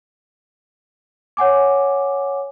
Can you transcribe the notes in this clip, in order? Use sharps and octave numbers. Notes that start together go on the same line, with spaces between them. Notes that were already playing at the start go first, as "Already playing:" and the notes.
C#5 F#5 G#5 D6